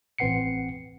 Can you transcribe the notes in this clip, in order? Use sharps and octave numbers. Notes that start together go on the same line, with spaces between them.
A1 C4 B4 F#5 C7 C#7